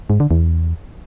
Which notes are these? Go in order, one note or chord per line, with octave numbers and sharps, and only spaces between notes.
G#2
D3
E2